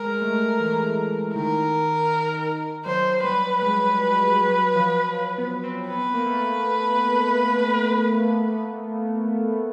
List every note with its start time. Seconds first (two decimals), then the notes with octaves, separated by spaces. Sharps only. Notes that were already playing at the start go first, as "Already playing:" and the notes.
Already playing: G#3 A#4
0.22 A3
0.60 E3
1.35 D#3 A#4
2.86 F#3 C5
3.23 G3 B4
3.62 G#3 B4
4.37 F#3
4.76 F3
5.13 F3
5.38 B3
5.64 C4
5.88 B3 B4
6.02 B3
6.14 A#3
6.26 A3